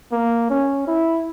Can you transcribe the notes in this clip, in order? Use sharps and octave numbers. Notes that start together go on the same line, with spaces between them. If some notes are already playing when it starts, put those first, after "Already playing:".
A#3
C#4
E4